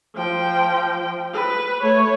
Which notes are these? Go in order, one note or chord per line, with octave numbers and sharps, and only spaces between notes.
F3 G5
B4
A3 C#5